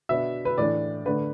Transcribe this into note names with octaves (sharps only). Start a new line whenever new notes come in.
B2 B3 D4 E5
B4
A2 E3 A3 D4 D5
D3 A3 D4 B4